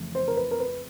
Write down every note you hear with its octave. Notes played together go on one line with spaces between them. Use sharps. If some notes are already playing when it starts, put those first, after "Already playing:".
Already playing: F2 C#3 E3 A3
C5
A#4
B4
A#4
B4